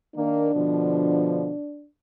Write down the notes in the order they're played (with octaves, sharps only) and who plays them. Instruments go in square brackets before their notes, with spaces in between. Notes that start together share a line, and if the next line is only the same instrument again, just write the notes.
[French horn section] D#3 A#3 [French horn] D4
[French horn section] B2 D3 F3